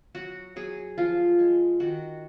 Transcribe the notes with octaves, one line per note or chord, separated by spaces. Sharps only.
F#3 F#4
F#3 G#4
F3 F4
G#3
D#3 F#4